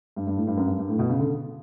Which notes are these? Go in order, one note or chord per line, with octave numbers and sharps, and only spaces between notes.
G2
G2
A2
G2
F#2
G2
G2
A2
B2
C#3
D3